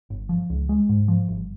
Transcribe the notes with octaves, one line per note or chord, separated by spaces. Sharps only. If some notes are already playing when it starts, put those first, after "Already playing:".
G1
F3
C#2
G#3
G#2
F3
G1